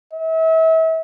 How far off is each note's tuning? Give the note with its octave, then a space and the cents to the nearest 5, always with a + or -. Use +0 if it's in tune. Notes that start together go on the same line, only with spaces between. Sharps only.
E5 -35